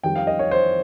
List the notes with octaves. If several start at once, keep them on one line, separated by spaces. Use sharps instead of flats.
F2 D#3 G3 G5
F5
D#5
C#5
C5